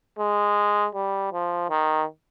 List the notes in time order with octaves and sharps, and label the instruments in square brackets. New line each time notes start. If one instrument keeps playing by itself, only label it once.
[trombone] G#3
G3
F3
D#3